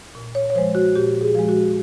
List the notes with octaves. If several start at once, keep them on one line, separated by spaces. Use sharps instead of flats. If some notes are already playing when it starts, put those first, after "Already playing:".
A#2
C#5
C#5
F3 G#3 C5
F#4
A#2 G4
G#4
F3 G#3
F#4